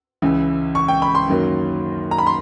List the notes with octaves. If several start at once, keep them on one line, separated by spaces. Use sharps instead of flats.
C#2 C#3 E3
C#6
G5
B5
C6
F#2 D#3 F#3 A#3
A#5
B5
C6